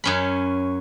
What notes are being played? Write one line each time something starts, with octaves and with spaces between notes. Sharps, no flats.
F#2 C#4 B5